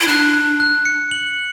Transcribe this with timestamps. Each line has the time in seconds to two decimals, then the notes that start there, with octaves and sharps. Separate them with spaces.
0.01 E4
0.07 D4 F#6
0.33 F#6
0.60 F#6
0.85 C#7
1.11 F#7